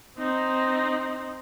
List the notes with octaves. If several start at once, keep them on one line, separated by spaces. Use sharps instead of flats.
C4 D#4